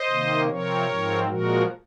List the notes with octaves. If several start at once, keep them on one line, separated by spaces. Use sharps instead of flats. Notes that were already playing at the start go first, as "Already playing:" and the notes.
Already playing: C5 D#5
C3 D#3 A#3
C3 F3 C4 A#4 C#5
G#2 F3 C4
A#2 F3 G#3 F#4 A#4